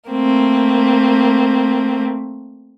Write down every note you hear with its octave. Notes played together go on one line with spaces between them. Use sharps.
A3 A#3 C4